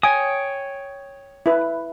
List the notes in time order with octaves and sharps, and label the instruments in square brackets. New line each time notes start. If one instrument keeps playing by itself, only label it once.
[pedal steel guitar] C#5 G5 D#6 [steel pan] G#5
[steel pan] E4 B4